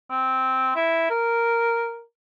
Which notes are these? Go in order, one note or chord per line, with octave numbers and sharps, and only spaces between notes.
C4
E4
A#4